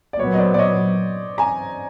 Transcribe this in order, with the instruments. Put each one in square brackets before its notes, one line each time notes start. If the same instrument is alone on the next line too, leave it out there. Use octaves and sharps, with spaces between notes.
[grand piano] D5
[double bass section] A#2 F#3 B3 [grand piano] C#5
[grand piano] D#5
C5 D5
D5
C#5 D#5
G#5 A#5